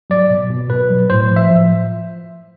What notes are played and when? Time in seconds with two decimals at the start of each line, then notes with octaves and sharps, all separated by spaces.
0.10 F#3 D5
0.30 B2
0.50 B2
0.70 B2 B4
0.90 F#3
1.10 A2 C5
1.31 F3
1.36 E5
1.50 F3